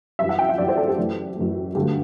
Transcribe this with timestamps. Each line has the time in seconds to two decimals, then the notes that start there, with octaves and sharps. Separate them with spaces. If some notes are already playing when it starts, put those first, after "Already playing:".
0.19 F#2 E3 G3 E5
0.29 F#5
0.39 G5
0.49 E5
0.58 F#2 E3 G3 D5
0.68 C5
0.77 A4
0.88 G4
0.97 F#2 E3 A3
1.36 F#2 E3 A3
1.75 G2 D3 F#3 A3 G4